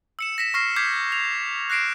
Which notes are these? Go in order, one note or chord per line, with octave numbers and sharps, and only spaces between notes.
E6 C#7 E7
A#6 B6 E7
C#6 F6 A#6 C7 E7
D6 G6 G#6 B6 C7
F7
F#6 A#6 C7 D7 E7